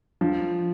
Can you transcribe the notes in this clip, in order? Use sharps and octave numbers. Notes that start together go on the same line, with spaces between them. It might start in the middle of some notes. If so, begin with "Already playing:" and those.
F3